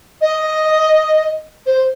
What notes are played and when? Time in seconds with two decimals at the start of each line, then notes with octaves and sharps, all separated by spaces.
0.22 D#5
1.67 C5